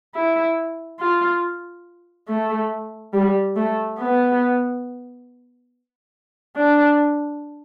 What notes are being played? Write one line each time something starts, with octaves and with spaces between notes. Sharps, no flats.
E4
F4
A3
G3
A3
B3
D4